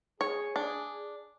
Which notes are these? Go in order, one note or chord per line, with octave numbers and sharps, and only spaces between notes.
G#4 C#5
D4